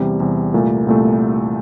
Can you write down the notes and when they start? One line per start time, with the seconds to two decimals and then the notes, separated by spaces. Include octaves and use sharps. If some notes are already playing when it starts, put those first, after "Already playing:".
Already playing: E2 C3 G3
0.20 E2 C3 G3
0.54 C2 A#2 A3
0.87 C2 A#2 A3